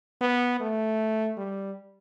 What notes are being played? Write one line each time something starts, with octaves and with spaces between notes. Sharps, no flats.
B3
A3
G3